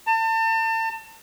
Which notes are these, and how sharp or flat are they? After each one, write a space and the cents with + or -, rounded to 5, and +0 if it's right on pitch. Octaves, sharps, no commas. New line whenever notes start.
A5 +35